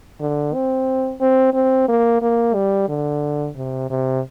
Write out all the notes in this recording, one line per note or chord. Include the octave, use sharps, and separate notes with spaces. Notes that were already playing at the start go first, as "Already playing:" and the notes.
D3
C4
C4
C4
A#3
A#3
G3
D3
C3
C3